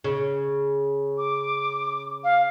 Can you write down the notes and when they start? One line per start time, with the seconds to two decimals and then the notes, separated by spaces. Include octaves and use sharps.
0.04 C#3
1.18 D6
2.24 F5